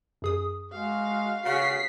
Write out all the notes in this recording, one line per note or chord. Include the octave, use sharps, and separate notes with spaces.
F#2 G#4 D#6
G#3 F#4 F5
C#3 F#4 B6 C7